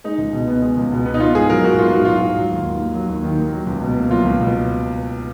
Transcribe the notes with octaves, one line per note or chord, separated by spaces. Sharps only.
G#3 D#4
C#2
B2
B3
G#3
C#2
B2
B3
D#4
B3 F4
G#2 G#4
F#3 A#4
G#2 F#4
B3 F4
G#2 F#4
F#3 F4
G#2
F#3
D#2
D#3
A#3
F#3
D#2
D#3
A#3
F#3
C#2
B2
A#3
F#3 F4
C#2
B2